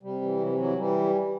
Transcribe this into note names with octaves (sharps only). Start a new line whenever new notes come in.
C3 G3
E3
C3 F#3
G3
E3 F#3
E3 G3